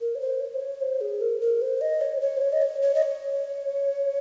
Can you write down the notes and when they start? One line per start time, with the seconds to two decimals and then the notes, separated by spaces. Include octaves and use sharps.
0.01 A#4
0.15 C#5
0.21 C5
0.40 C#5
0.55 C5
0.61 C#5
0.81 C5
1.01 G#4
1.21 A#4
1.41 A#4
1.62 C5
1.81 D#5
2.01 C#5
2.17 C5
2.21 C#5
2.37 C5
2.42 C#5
2.53 D#5
2.62 C#5
2.82 C#5
2.95 D#5
3.02 C#5